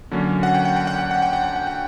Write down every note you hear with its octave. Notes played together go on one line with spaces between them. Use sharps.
D3 F#3 A#3 C#4
F#5
G5
F#5
G5
F#5
G5
F#5
G5
F#5
G5
F#5
G5